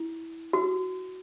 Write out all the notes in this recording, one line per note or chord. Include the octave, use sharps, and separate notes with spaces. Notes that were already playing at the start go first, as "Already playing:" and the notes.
Already playing: E4
F#4